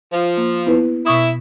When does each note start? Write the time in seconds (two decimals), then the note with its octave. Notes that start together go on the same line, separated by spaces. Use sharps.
0.13 F3
0.37 A#3
0.67 B3 E4 B4
1.06 B2 E4 C#6 D#6